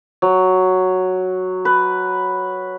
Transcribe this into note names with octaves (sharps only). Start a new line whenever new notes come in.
F#3
B4